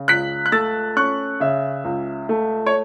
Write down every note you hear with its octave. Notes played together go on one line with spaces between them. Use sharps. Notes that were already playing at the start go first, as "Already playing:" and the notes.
Already playing: C#3
C#2 F#6 B6
F#6
A3 E6 A6
C#4 C#6 F#6
C#3 E5
C#2
A3
C#5